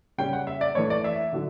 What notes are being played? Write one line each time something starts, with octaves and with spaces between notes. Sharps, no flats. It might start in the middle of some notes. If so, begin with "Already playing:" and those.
C#3 G3 C#4 G5
F#5
E5
D5
E3 A3 D4 C#5
D5
E5
D3 F#3